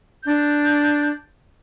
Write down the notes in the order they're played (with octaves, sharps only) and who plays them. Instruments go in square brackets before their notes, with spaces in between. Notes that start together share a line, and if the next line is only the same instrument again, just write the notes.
[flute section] D4 G6